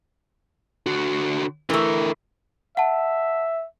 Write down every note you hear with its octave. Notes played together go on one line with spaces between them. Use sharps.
D3 F#4
D3 E3 A3 A#4
E5 F#5 A5